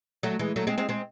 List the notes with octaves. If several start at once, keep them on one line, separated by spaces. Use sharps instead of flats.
F#3 A3
E3 G#3
F#3 A3
G#3 C4
G#3 C4
G#3 C4